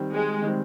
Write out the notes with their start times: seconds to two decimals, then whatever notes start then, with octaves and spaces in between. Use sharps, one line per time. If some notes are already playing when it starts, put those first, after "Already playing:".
Already playing: D#3 G3 C4
0.14 G#3
0.42 D#3 G3 C4